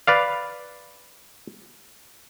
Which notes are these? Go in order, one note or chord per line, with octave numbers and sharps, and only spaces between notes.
B4 D5 F5